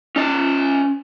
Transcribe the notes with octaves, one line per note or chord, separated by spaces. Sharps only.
C#4 D5